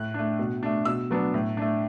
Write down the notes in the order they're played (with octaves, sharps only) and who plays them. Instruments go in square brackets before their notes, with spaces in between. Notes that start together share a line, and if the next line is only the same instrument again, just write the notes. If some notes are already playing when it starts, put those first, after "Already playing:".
Already playing: [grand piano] A2 F#6
A3 D4
B2
A3 D4
B2 E6
F#3 B3 D4
A2
A3 D4